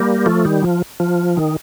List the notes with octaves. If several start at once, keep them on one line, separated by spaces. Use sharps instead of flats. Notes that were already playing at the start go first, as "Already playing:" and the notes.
Already playing: G3 A#3
F3 A3
D#3 G3
F3
F3
D#3